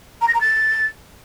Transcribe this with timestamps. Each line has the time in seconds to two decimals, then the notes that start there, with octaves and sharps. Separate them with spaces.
0.21 A#5
0.27 A#6
0.34 A#5
0.40 A6